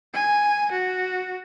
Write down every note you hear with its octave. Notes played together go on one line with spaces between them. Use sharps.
G#5
F#4